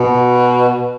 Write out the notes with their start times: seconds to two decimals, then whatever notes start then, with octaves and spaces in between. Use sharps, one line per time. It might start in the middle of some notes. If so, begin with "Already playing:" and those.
Already playing: B2